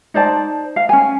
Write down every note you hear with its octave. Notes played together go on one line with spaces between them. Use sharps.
D#4 C5 D5 A5
F5
C#4 G#5